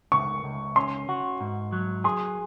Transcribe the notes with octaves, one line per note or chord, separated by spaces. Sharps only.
C#2 C#6
C#2
C#4 C6
F#4
G#2
F#3
G#4 C6